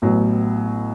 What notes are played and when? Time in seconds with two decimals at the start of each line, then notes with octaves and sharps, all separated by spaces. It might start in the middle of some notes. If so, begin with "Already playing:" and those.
0.02 A1 A2 F#3 B3